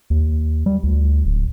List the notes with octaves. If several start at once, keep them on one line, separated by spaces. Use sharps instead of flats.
D#2
G3
D2
D1